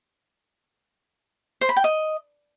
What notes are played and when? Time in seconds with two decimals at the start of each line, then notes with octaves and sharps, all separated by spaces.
1.61 C5
1.69 B5
1.77 G5
1.84 D#5